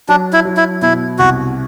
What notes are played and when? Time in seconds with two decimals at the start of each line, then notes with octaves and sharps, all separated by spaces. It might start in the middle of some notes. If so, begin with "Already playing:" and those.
0.09 F#3 D4
0.33 E4
0.45 F#3
0.57 E4
0.82 B2 E4
1.19 C2 F#4